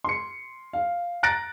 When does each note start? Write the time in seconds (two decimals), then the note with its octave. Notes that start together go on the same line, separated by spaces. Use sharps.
0.04 C6 C#7
0.73 F5
1.23 A#5 F#6 A6 A#6 D7